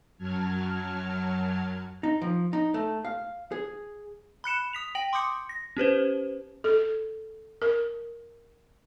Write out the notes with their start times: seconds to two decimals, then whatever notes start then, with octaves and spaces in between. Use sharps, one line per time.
0.18 F#2 F#3 A5 F6 G#6
2.03 D#4
2.22 F3
2.53 D#4
2.74 A3
3.05 F5
3.52 G#4
4.44 B5 F#6 C#7 E7
4.73 D#6 B6 F7
4.95 G5 A#6 D7 F#7
5.13 C6 D6 D#6 G6 C#7
5.49 A#6
5.77 C#4 G4 B4 C5
6.64 A4
7.62 A#4